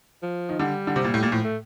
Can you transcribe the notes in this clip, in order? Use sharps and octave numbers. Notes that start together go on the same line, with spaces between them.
F3
D#3
D3 G3
D3
C3
A#2
A2
A#2
A2 F3
A3